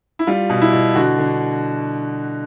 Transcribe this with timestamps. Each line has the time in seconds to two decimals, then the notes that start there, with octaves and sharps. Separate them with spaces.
0.19 E4
0.27 G3 F4
0.50 B2
0.62 E4
0.73 B2
0.95 D3 F#4
1.19 D3